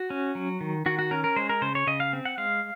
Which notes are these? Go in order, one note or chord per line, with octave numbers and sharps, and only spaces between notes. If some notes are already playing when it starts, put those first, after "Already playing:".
Already playing: F#4
C#4
F#3
D#3
D#3 F#4
F#4
C#4 A#4
A#4
G#3 C5
A#4
C#3 C5
C#5
C#3 D#5
F5
C4
F#5
G#3 F5